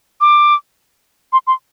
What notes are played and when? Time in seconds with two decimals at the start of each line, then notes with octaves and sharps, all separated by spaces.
0.21 D6
1.33 C6
1.47 C6